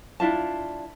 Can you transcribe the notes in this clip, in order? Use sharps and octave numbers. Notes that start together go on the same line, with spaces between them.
D4 E4 F4 A5